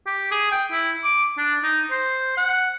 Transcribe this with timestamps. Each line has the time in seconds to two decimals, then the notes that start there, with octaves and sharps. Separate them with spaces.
0.07 G4
0.32 G#4
0.52 G5
0.72 E4
1.04 D6
1.38 D4
1.64 D#4
1.91 C5
2.38 F#5